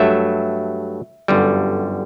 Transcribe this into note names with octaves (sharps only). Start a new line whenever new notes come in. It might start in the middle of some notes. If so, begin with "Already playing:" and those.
Already playing: G2 F#3 A3 E5
G1 F#2 D3 G3